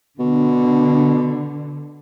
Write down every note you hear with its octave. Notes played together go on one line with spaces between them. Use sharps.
B2 D3